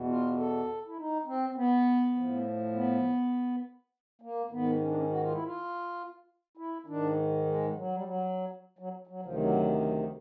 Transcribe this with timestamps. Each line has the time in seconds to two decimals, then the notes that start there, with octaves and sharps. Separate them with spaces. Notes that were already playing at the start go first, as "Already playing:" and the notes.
Already playing: E2 B2
0.08 F4
0.38 A4
0.87 E4
0.97 D#4
1.26 C4
1.50 C4
1.56 B3
2.15 A2 F3
2.73 B3
4.22 A#3
4.50 G#2 D#3 B3
4.80 C#4
4.88 D4
4.96 C#4
5.10 F#4
5.22 F4
5.33 E4
5.44 F4
6.57 E4
6.86 G#2 D#3 D4
7.46 G#3
7.75 F#3
7.92 G3
8.04 F#3
8.79 F#3
9.07 F#3
9.22 D2 C3 D#3 F3
9.35 F#3
9.81 F#3
9.91 F3